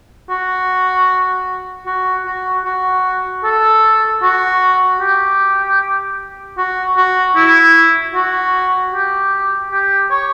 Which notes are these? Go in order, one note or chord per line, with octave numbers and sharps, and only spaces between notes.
F#4
F#4
F#4
F#4
A4
F#4
G4
F#4
F#4
E4
F#4
G4
G4
C#5